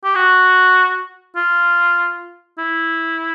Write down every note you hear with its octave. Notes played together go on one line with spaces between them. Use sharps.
G4
F#4
F4
E4